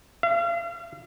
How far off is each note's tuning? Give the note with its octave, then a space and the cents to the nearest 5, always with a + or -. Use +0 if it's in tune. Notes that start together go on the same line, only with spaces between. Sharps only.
F5 -40